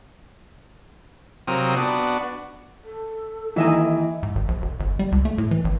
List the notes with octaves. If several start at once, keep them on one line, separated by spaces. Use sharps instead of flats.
C3 F#3 C4 F4 A#4 D#6
B3 D4 F#4
A4
D#2 E3 D#4 D#5 E5 G#5
G#2
G#1
A#1
E1
G1
G3
C#2
A3
A2
E3
G#1